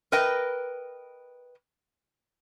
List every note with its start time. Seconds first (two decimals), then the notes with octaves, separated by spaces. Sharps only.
0.12 A#4 B4 D#5 G5